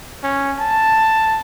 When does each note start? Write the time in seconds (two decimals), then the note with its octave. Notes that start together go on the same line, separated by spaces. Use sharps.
0.24 C#4
0.59 A5